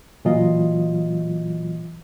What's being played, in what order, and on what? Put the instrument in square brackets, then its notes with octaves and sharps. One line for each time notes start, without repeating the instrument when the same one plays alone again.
[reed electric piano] A#2 E3 F#3 F4 D#5